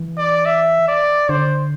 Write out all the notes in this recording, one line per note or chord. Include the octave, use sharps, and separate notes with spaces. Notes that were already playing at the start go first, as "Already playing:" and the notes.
Already playing: E3
D5
E5
D5
D3 C5